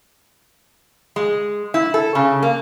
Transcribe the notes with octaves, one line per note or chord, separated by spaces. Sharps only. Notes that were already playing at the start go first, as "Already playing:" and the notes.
G#3
E4
A4
C#3
A#3